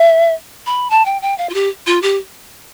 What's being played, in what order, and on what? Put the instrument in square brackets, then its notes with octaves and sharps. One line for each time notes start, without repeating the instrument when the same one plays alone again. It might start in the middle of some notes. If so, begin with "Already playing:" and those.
Already playing: [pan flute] E5
B5
A5
G5
G5
F5
F4
G4
F4
G4